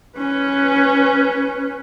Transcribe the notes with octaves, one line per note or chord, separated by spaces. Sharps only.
C#4 B4